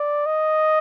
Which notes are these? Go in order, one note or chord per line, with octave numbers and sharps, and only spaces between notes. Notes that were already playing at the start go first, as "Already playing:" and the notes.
Already playing: D5
D#5